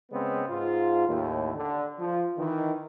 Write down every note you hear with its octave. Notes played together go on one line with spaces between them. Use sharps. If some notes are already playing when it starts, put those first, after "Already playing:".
C#3 G#3 B3 C4
G#2 F4
D#2 A2
D3
F3
D#3 E3